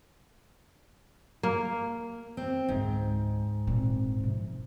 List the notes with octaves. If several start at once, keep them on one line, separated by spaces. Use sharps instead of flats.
A#3
C4
C#2 G#2 D3
A#2 C4
C3 F3